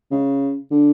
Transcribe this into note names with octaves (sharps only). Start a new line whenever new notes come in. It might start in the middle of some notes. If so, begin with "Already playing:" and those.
C#3
D3